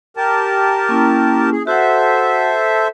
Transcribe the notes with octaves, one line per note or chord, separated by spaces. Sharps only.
G4 A#4 A5
A#3 C#4 E4
G#4
F#4 A4 C5 E5 F#5